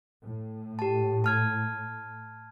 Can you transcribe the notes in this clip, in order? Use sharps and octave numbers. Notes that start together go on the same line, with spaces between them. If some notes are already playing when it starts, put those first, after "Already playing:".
A2
G4 A5
A5 F6 G#6